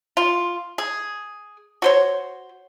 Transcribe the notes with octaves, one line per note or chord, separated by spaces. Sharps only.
F4
G#4
F#4 C5 C#5